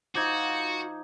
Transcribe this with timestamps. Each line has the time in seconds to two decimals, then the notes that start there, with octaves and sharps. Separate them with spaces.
0.15 F3 D#4 F4 F#4 D6 G6 G#6